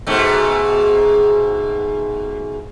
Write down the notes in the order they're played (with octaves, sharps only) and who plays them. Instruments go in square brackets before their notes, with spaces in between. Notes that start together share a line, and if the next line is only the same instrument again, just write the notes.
[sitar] G#2 B2 A3